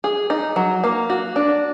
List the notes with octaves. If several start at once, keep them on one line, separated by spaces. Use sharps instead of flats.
G#4
D#4
F#3
A#3
F#4
D4